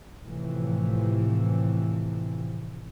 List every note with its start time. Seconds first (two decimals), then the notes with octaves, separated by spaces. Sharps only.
0.24 A2 C3 E3 F3